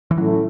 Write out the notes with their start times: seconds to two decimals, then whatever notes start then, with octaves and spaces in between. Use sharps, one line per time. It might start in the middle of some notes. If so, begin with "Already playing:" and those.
0.11 E3
0.18 A2 F#3 A3 C#4 E4